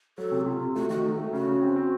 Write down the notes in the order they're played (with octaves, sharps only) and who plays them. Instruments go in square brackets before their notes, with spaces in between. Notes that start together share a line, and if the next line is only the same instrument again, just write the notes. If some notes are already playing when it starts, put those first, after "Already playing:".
[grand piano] F#3 [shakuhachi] A4
[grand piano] C3
[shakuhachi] F#4
[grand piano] C3 [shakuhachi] F4
[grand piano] C3
[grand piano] A3 [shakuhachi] F#4
[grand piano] D#3 [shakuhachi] F#4
[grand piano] A3 [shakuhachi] D#4
[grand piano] A3 [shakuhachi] F#4
[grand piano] C#3 [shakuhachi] F#4
[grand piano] C#3
C4
C4